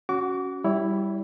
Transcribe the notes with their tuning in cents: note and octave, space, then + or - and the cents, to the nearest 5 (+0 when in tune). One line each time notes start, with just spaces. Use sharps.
C#4 +0 F#4 +0 D6 -30
G3 +0 E4 +0 C#5 +30